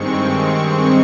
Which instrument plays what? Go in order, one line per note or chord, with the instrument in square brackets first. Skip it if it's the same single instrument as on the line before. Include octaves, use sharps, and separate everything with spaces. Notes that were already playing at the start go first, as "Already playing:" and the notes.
Already playing: [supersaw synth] G2 D#3 G#3 C4 C#6